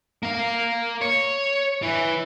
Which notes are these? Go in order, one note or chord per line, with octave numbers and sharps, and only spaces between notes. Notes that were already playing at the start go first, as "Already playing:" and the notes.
A#3 F5
C#5
E3